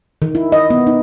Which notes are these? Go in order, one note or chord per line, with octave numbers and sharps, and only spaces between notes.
D#3
E4
D#5
B3
D#4